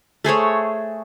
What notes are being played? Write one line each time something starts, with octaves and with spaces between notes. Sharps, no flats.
A3 G#4 C5 C#5